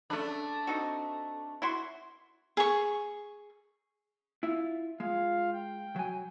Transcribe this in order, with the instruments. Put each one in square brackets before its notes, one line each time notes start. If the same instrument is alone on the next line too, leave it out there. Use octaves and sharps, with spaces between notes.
[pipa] C#3 B5 [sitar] A3 D4
[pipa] C4 D#4 F#4
E4 F#4 C6
[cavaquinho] G#4 C#6
[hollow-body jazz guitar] E4 F4
[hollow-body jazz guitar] G#3 [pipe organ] F4 F5
[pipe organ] G5
[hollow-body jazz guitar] F#3 G#5